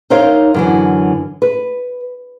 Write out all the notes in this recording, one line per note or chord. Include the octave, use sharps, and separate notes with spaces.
D#4 A#4 C5 C#5 F5
F#2 D3 E3
B4